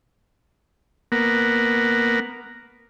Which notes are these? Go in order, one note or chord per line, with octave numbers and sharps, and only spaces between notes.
A#3 B3 A#4 F#5